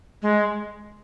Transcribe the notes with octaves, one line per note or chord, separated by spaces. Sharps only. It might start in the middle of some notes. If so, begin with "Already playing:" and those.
G#3